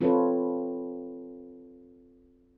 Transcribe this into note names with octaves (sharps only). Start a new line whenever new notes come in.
C4 F4 A4 B4 C#5